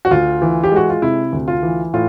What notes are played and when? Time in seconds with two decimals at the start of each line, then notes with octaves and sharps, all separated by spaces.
0.05 F#4
0.11 D2 F4
0.42 E3
0.64 G4
0.72 G#3 F#4
0.89 F4
1.02 C3 E4
1.33 D2
1.48 F4
1.63 E3
1.94 A2 F4